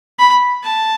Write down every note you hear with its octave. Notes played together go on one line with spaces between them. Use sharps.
B5
A5